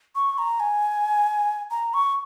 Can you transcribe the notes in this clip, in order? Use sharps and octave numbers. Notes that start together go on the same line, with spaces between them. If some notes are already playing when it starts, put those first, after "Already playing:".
C#6
A#5
G#5
A#5
C#6